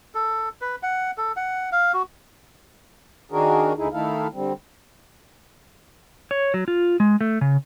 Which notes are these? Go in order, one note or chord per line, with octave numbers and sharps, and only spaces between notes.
A4
B4
F#5
A4
F#5
F5
F#4
D#3 D4 F#4 G#4 A#4
D2 D3 D#4 E4 G#4
D#3 A3 D#4 E4 A4 F5
D3 G3 C4
C#5
F#3
F4
G#3
A3
C#3